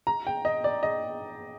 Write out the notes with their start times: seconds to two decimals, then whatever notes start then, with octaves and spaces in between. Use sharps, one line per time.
0.07 A#5
0.27 G5
0.45 D#5
0.64 D5
0.83 D#5